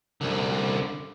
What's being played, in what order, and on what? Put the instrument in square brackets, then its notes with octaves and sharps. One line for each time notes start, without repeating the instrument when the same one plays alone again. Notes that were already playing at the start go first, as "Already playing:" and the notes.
[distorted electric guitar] C2 D3